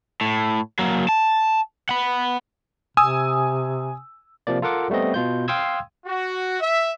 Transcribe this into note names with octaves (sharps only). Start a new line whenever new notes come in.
A2
F#3 A#3
A5
F#5 B5
C3 G#5 D#6 E6
C3 F3 A#3 D5
F4 A4 A#4 F#5 D6
G3 A3 B3 C4 D#5
B2 F4 G6
F5 G5 C6 D#6 E6 G#6
F#4
E5